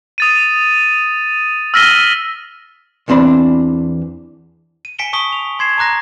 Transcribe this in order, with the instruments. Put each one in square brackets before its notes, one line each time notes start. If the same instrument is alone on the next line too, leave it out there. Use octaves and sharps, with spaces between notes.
[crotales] D#6 A6 D#7
E6 F6 A#6 B6 D#7 G7
[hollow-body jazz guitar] E2 E3 C4 D4 B5
[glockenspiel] D#7
G#5 B6 C#7 D7 E7 G7
A5 C#6 D#6 B6 G7
F7
C6 G#6 C7 E7
A5 A#5 D6 F#6 A#6